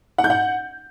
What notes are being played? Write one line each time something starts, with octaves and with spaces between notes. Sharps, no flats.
F#5
G6
F#5